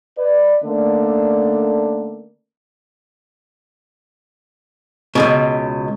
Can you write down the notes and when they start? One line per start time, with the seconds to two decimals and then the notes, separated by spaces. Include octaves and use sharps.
0.18 B4 D5
0.63 D3 A3 A#3 C#4 D5
5.15 C#2 G#2 B2